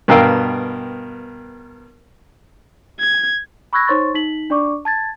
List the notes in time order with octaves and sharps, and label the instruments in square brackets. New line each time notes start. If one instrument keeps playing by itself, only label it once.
[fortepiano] G2 B2 A#4 F5 G5 E6
[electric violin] G#6
[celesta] B5 C#6 E6 F#6 G#6 A#6
D#4 C5 C#5 C6 C#6 A6
D#4 B6 F#7
D4 D5 C#6 D6
A5 G#6 A6